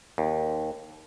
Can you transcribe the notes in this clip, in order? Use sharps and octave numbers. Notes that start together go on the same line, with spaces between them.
D#2